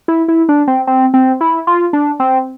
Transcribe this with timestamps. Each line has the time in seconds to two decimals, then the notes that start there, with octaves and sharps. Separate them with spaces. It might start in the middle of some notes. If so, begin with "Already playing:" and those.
0.08 E4
0.28 E4
0.49 D4
0.68 C4
0.87 C4
1.14 C4
1.41 E4
1.67 F4
1.93 D4
2.20 C4